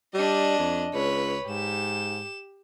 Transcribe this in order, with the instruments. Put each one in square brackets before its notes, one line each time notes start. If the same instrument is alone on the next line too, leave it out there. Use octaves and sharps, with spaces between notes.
[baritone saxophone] G3 [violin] D4 D#5
[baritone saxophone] F2
[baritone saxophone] C#2 [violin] B4 C#5
[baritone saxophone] G#2 [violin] G4 E7